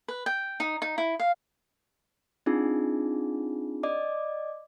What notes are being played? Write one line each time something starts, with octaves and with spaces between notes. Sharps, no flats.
B4
G5
D#4
D#4
E4
F5
C4 D4 D#4 F4 G#4
D5 D#5 D6